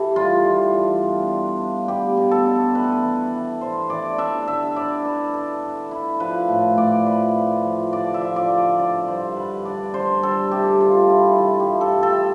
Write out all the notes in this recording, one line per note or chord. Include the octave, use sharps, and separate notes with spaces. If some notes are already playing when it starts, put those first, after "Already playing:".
Already playing: E3 G4 A4
G3 F4
E3
D4
B2
D4
D4
B3 G4
B2
A4
D4
E3 B4
A4
B4
E3
E3
D4 C5
E3 D5
D4 E5
D3 E5
E4 D5
E4 B4
E4 A4
D3
E4
F3 B4
A2
A2 D5
F3 B4
C4
F3
D3 D5
E5
F3
D5
D3
D3 D5
G2 C5
D3 B4
D4 D5
D4 C5
G3 A4
C3 G4
D4 F4
C3 E4
E3 F4
G4
G2
A4
G2
A4